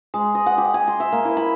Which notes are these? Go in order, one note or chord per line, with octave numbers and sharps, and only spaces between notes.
G#3
D#5
F#5
G4
G#5
C6
E5
A#3
E4
B5